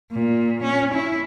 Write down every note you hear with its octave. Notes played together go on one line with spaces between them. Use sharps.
A#2
C#4
E4